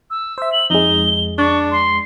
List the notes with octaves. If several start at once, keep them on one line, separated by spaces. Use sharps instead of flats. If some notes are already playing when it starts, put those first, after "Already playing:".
E6
C5 E5
F#7
F2 G#3 D#4 G7
D4 C#6
C6